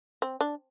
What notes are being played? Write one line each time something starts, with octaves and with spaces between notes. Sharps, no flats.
C4
D4